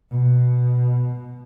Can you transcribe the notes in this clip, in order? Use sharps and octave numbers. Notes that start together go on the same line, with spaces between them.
B2